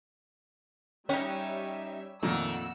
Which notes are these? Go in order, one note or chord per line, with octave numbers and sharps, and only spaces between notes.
G3 C#4 D#4 C#5 E5 G5 F#6
F2 A#2 D#3 A3 F#5 E6